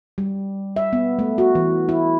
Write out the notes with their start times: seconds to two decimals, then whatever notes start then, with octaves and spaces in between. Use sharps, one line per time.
0.18 G3
0.76 E5
0.93 B3
1.19 A3
1.38 F#4
1.55 E3
1.89 E4